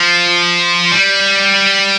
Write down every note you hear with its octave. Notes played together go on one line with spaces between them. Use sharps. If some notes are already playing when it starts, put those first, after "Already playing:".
Already playing: F3
G3